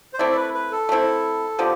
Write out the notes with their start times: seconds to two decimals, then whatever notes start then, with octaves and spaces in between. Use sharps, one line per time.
0.14 C5
0.19 A3 C4 E4 D5
0.31 A4
0.36 B4
0.54 B4
0.72 A4
0.89 A3 C4 E4
1.59 D3 F3 B3 G4